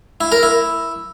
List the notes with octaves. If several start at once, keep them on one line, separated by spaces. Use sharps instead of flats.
E4
A#4
E4